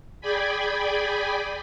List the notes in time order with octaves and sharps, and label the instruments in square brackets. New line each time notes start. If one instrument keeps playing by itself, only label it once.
[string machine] G#4 D5 G5 G#5 B5